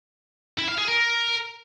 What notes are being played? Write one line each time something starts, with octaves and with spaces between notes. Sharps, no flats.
E4
F5
G#4
A#4